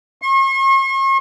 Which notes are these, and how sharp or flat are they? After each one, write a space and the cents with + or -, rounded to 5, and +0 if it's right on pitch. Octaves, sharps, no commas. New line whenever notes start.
C#6 -45